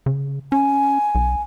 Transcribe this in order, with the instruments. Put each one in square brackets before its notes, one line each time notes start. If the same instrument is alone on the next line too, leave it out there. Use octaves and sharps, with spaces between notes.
[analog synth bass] C#3
[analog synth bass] C#4 [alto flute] G#5
[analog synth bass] B1